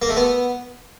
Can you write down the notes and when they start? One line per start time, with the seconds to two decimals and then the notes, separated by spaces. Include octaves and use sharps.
0.02 A#3
0.09 A3
0.16 B3